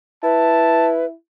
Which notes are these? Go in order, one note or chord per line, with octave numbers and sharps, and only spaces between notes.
E4 B4 A5